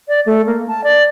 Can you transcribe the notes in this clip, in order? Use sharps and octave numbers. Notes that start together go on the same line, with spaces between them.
D5
A3
A#3
A5
D5